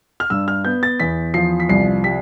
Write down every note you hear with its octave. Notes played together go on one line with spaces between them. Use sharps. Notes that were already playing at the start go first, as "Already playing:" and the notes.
F6
G2 E6
F6
B3 G6
A6
E2 B6
F3 C7
B6
C2 C7
G3 B6